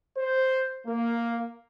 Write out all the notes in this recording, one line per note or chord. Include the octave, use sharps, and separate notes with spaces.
C5
A#3